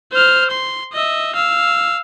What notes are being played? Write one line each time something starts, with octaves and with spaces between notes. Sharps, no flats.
C5 F6
C6
D#5 E5
F5 E6